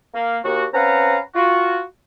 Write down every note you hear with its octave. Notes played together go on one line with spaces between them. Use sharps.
A#3
D#2 F#4
C4 C#4 B4 F5 F#5 A#5
F4 F#4